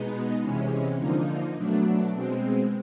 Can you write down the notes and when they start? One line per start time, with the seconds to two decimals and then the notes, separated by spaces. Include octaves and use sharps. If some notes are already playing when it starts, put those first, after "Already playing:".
Already playing: B2 G#3 B3 D#4
0.42 E2 C3 E3 G#3 C#4
0.98 D3 F3 A#3 D#4
1.55 B2 F#3 A3 D4
2.12 B2 G#3 C4